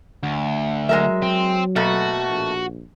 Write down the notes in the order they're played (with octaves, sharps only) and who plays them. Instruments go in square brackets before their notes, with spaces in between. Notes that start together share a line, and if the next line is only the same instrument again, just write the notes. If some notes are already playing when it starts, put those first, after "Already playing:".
[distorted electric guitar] D2
[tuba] F#3 [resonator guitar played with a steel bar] G#3 A#4 E5
[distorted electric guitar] C4
[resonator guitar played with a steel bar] B2 A3 A#3 [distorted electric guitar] F#4
[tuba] A#1